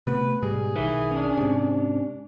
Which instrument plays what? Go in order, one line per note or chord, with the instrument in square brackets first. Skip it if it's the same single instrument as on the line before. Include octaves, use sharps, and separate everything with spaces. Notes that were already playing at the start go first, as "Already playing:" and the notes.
[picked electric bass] C3 A3 B3 [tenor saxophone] B4
[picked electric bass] G#2 B2 G3 [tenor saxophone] G#4
[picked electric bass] B1 D#3 [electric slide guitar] B4 E5
[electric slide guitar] C#4 D4
[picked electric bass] G#2 C3